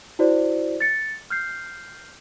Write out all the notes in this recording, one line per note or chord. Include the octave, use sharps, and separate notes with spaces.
E4 F#4 C5 D5
A6 C#7
F6 G6 C7